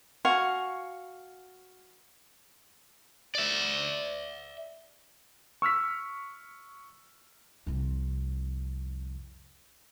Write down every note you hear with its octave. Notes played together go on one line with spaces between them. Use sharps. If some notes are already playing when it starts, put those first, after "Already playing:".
F#4 F5 G#5 C#6
D5 E5
C#6 E6 F6 B6
C2 F2